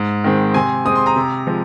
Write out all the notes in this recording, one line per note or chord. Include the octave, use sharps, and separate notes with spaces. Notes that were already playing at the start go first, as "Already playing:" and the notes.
Already playing: G#2
D#3 G#3 C4
C3 G#5 C6
G#3 C4 D#6
C6
A#5 D#6
C3
F3 G#3